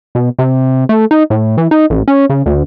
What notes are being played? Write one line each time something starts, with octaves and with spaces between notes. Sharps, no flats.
B2
C3
A3
D#4
A2
E3
D#4
A1
C#4
C#3
D2